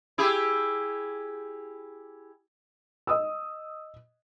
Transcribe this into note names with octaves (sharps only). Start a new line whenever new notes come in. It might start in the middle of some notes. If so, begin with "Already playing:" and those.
E4 G4 G#4
D#5 D#6 E6